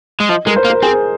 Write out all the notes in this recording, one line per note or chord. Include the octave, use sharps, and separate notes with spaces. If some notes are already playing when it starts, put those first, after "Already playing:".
G#3
F3 D#5
G#3 A#4
C5
A#3
A#4
C4 G#4